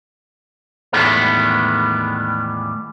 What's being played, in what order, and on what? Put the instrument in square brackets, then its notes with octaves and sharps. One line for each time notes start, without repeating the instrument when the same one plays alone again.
[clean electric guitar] E2 A2 D#3 G3 G#3 B3